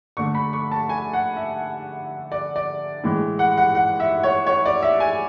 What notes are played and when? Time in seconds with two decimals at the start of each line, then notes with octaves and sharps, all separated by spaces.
0.17 D3 A3 C#6
0.35 B5
0.53 C#6
0.72 A5
0.89 G#5
1.13 F#5
1.37 E5
2.32 D5
2.56 D5
3.04 A2 E3 G#3
3.39 F#5
3.57 F#5
3.75 F#5
4.00 E5
4.23 C#5
4.47 C#5
4.66 D5
4.82 E5
5.00 G#5